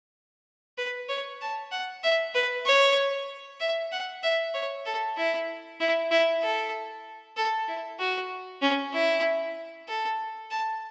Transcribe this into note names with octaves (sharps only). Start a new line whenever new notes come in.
B4
C#5
A5
F#5
E5
B4
C#5
E5
F#5
E5
C#5
A4
E4
E4
E4
A4
A4
E4
F#4
C#4
E4
A4
A5